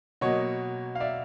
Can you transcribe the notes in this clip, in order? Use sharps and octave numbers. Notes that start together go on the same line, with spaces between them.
B2 F#3 A#3 C#5 D#5
F5
D5 E5